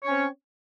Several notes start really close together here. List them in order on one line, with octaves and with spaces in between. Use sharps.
C#5 C#4 C4